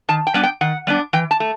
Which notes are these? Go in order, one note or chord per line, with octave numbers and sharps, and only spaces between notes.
D#3 A5
G5
G3 B3 D4
G5
D#3 F#5
G3 B3 D4
E3 G5
A5
A3